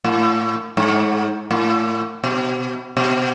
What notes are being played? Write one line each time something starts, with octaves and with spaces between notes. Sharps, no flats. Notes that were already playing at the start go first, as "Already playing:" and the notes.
A2
G#2
A2
B2
B2